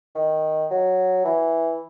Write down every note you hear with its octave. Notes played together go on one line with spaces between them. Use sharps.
D#3
F#3
E3